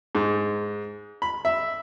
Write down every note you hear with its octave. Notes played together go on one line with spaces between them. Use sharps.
G#2
B5
E5